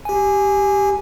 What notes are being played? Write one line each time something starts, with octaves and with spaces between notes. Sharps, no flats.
G4 G#5